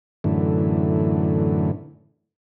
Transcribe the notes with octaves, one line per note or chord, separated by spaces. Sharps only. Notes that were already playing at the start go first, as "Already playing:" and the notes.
F#2 A2 D3 E3